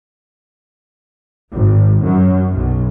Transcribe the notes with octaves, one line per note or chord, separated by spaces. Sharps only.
G#1
F#2
B1